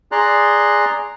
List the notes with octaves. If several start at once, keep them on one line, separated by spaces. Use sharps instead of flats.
G#4 D5 A#5 C6 F#6